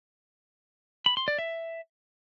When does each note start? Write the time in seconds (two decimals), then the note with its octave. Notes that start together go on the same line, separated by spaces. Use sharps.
1.06 B5
1.17 C6
1.28 D5
1.38 E5